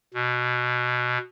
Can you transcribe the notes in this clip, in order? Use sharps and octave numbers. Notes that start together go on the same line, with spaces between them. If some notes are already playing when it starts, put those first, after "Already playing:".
B2